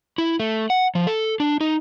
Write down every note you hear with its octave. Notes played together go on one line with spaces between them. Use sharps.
E4
A3
F#5
F3
A4
D4
D#4